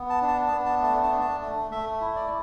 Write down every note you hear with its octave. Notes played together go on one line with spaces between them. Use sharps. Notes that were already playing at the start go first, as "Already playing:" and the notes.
Already playing: B3
A5
D4
A5
A5
B3
A5
A3 A5
A5
D4
A5
A3
A3 E5
E4
D5